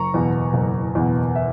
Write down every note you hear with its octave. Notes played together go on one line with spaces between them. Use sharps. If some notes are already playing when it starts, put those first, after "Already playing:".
Already playing: F#1 A#5 C#6
E2 B2
F#1
E2 B2
E5